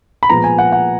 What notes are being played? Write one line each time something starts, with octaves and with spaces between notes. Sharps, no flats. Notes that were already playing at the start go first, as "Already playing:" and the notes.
B5
A#2 F3 G#3 B3 A#5
G#5
F#5
F#5